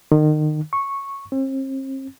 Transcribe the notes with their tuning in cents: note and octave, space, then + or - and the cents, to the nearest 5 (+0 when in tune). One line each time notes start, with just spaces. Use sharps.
D#3 -30
C#6 -5
C4 +40